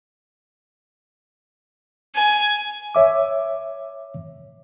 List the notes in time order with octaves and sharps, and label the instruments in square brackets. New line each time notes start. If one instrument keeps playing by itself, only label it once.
[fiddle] G#5
[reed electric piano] C#5 E5 D6